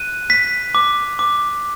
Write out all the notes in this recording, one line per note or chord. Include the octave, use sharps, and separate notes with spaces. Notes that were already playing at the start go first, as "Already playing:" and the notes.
Already playing: F#6 D#7
B6
D6
D6